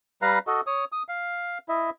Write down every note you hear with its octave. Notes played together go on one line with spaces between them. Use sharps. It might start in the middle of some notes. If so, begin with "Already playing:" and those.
G3 B4 F5 A#5
F#4 A4 D#5
C#5 D#6
D#6
F5
E4 D#5 E5